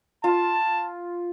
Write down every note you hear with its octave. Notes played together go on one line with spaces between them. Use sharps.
F4 A5